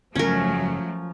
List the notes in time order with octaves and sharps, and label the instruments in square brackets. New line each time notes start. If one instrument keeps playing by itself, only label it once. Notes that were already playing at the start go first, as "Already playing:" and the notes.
[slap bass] F#1 G#2 [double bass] F3 [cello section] F#3 A3 [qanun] C#4 A#4